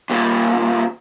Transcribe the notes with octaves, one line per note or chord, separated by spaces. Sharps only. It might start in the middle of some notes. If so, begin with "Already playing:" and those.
D#2 A#2